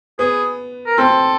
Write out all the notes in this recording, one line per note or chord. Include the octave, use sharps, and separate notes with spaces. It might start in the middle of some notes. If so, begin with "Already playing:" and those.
B3 G#4
A#4
C4 A4